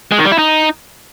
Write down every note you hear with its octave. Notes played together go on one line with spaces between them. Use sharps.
G#3
D#3
G3
E4
D#4